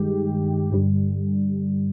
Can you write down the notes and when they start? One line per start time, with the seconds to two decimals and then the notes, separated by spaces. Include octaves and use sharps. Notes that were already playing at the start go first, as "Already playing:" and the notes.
Already playing: G2 D#3 G#3 G4
0.72 G2 D3 G3